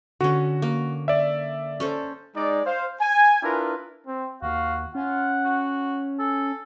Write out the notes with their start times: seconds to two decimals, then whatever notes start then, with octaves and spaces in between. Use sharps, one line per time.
0.21 D3 C#4 F#4
0.62 A#3
1.08 D5 E5
1.80 C#4 A4 C5
2.36 G#3 D#4 D5
2.66 C5 F5
3.01 G#5
3.43 D4 E4 F4 A#4 B4
4.07 C4
4.42 D#2 F#4 F5
4.95 C#4 F4 F#5
5.45 F#4
6.19 A4 G#5